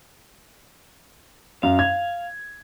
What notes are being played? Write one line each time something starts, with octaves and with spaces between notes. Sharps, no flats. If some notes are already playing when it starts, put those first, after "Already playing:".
F#2 F5
G#6